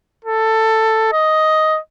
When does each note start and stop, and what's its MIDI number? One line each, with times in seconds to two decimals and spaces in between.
0.25 1.11 69
1.13 1.79 75